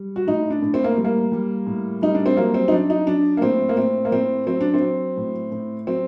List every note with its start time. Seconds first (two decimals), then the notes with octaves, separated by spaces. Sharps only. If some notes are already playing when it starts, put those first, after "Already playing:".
Already playing: G3
0.16 F#4
0.27 A2 D#4
0.50 D4
0.62 A2
0.74 C4
0.84 A#3
0.97 G3
1.04 A#3
1.32 G3
1.67 A2
2.02 G3 D#4
2.15 D4
2.26 C4
2.37 F#3 A#3
2.54 C4
2.68 D#4
2.72 F#3 D4
2.90 D#4
3.07 F#3 D4
3.37 A#3
3.42 A2 C4
3.69 A#3
3.77 A2 C4
4.05 A#3
4.12 A2 C4
4.47 F#3 C4
4.61 D4
4.74 C4
4.82 F#3
5.17 A2
5.52 A2
5.87 F#3 C4